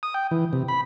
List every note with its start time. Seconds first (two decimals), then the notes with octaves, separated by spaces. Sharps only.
0.03 D#6
0.14 G5
0.31 E3
0.53 C3
0.68 B5